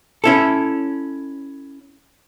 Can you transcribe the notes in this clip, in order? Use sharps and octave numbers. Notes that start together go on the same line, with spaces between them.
C#4 E4 A4